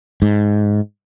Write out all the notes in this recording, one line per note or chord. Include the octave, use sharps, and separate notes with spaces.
G#2